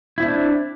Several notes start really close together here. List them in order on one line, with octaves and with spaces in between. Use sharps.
E4 C4 D4